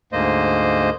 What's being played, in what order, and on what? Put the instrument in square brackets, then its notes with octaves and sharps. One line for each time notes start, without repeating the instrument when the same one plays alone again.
[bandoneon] D2 G#2 A#3 C5 D#5